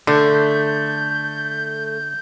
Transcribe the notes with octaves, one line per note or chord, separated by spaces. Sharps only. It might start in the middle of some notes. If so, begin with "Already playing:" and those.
D3 A3 G6